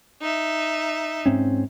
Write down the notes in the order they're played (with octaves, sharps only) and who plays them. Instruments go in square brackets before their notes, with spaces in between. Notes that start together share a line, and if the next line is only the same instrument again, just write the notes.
[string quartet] D#4 E5
[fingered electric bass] G#2 C4 C#4